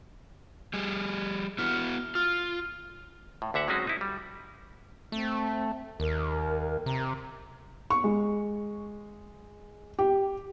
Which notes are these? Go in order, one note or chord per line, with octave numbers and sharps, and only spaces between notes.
G3 G#4
B3 E4 F#4 F6
F4 F6
A2
D2 D3 E5 F#5
F#3 G#3 C4 C#4 D#4 F#4
D#4 E4
G3
A3 C4
D#2 A#4
C3 A#5
C#6
G#3
G4